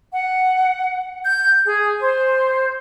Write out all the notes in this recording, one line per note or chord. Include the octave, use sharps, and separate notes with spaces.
F#5
G6
G#4
C5